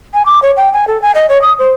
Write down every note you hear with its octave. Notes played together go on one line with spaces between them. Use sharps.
G#5
D6
C#5
G5
G#5
A4
G#5
D#5
C#5
D#6
C5